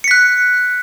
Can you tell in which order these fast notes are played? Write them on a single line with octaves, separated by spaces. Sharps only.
C#7 B6 F#6